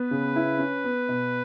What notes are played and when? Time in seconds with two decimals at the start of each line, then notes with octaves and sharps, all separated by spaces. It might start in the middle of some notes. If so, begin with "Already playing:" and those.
Already playing: B3 B4
0.11 C#3
0.36 E4
0.59 C#4
0.84 B3
1.09 B2